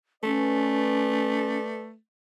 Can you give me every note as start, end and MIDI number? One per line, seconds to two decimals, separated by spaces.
0.23 1.96 57
0.23 1.58 61
0.23 1.90 71
0.23 1.90 74